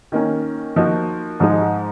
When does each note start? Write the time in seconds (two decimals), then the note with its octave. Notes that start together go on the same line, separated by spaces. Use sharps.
0.12 D#3 A#3 C#4
0.76 F3 A#3 D#4 F#4
1.40 G#2 F3 G#3 D#4